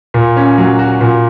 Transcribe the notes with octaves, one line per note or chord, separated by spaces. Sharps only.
A#2
C#4
F#3
F#4
A#2